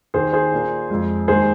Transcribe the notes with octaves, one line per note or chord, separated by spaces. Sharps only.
D#2 D#3 A#3 G#4 C5
G#4 C5
A#2 A#3
F2 F3 G#3
D#2 D#3 G#3 G#4 C5